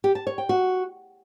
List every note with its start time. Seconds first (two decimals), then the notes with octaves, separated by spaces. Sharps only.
0.04 G4
0.15 A5
0.27 C#5
0.38 G5
0.49 F#4